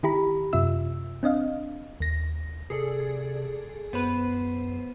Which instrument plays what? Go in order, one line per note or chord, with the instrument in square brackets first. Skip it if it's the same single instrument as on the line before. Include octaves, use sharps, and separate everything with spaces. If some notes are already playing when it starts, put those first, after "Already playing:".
[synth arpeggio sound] D#3 E4 G4 A#5 B5
F#2 C3 F4 E5 E6
C4 D4 D#5 F5
D#2 A#6
[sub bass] C3 [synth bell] G#4 A4 D5
[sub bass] F#2 [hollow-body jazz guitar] B3 B4 [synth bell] C5